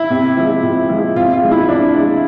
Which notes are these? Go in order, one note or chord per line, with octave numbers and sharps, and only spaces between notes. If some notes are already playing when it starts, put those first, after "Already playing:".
Already playing: E4
C3
F3 G#3
C3
F3 G#3
C3 F4
F4
F3 G#3
E4
C3 D4
F3 G#3